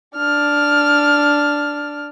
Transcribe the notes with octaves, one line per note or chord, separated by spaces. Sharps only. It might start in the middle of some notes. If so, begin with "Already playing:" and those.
D4 F6